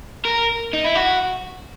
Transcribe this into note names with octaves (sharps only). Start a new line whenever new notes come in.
A#4
D#4
E4
F#4